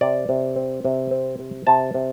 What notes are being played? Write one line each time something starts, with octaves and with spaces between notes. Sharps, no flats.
C3 D5
C3
C4
C3
C4
C3
C3 A5
C3